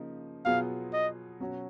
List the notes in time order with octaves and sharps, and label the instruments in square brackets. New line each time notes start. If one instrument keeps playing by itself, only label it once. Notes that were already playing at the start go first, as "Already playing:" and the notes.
Already playing: [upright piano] C#3 F3 A#3 D#4
[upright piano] B2 F#3 B3 F4 G#4 [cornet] F5
[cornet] D#5
[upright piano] B2 F#3 C#4 F#4